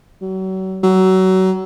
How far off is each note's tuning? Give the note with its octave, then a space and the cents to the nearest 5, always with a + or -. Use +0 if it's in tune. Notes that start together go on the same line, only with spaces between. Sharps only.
F#3 +35
F#3 +25